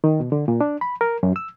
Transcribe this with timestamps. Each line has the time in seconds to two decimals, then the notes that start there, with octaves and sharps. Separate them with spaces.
0.04 D#3
0.20 B2
0.32 D3
0.48 A#2
0.61 D4
0.81 B5
1.01 A#4
1.23 F#2
1.36 E6